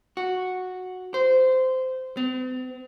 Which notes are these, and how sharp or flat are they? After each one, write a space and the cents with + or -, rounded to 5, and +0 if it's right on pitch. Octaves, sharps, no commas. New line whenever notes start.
F#4 -5
C5 -15
C4 -45